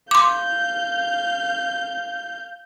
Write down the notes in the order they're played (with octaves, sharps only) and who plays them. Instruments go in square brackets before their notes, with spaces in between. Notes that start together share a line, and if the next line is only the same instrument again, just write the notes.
[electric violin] F5 G6 [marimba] C6 D6